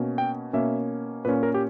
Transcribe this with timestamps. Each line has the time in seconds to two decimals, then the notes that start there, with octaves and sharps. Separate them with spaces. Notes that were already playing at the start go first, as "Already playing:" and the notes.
Already playing: B2 A#3 C#4
0.18 G5
0.53 B2 A#3 C#4 E5
1.25 A#2 A#3 C#4 B4
1.43 A#4
1.54 G4